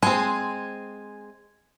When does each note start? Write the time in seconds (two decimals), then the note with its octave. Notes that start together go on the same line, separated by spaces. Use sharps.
0.03 G#3 C4 G#5